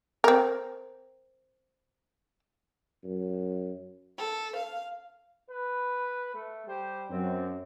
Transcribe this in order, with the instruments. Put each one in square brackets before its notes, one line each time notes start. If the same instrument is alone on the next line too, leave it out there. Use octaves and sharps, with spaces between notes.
[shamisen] C4 A#4
[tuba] F#2
[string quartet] A4
F5
[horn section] B4
A3
G3 G4 C5
[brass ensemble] F#2 [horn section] C4